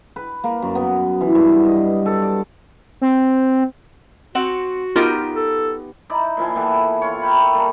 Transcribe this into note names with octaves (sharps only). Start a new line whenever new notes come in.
B4
A#3
F#2
B3
E3
G2
D#5
A4
D5
C4
C4 F#4 F#5
B3 D#4 F4 G4 A#4
A4
D#4 E4 D5
A#2 F3 E4 G#5
E3 B3 G4 A4
E4 F4 C#5
A#4 E5 G5 B5
G3 A#3 A4